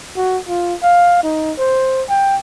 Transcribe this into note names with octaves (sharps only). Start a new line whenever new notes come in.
F#4
F4
F5
D#4
C5
G5